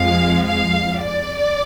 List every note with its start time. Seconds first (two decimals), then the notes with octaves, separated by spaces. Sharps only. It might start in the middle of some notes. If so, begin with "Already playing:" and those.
Already playing: F2 F3 G#3 F5
0.45 F5
0.99 D5